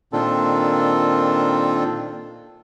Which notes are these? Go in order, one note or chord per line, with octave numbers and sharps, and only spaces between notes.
A#2 D#3 C4 D4 F4 A4